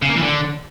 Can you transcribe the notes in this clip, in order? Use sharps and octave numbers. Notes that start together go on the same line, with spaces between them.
C#3
A#3
E3
D3